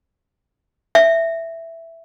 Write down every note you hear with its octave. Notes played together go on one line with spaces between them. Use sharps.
E5